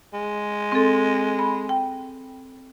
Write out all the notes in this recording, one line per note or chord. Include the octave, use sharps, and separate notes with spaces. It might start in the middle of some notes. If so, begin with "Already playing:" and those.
G#3
C4 A4
B5
G5